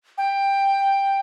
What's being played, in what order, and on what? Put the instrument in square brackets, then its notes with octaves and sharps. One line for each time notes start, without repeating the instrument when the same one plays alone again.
[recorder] G5